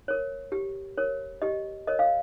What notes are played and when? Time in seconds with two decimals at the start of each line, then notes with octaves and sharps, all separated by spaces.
0.08 A#4 C#5
0.52 G4
0.98 A#4 C#5
1.42 G4 D#5
1.87 A#4 C#5 D#5
1.99 F5